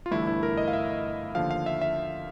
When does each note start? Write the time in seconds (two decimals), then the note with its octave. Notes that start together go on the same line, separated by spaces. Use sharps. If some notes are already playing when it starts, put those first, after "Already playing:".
0.06 F4
0.11 G1 G2 E3 A3 E4
0.27 E4
0.43 A#4
0.58 D#5
0.68 F5
0.73 E5
1.35 D#2 D3 F3 F5
1.51 F5
1.66 E5
1.81 E5